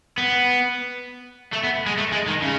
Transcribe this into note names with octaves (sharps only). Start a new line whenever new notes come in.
B3
A3
B3
G#3
A3
G#3
D#3
C#3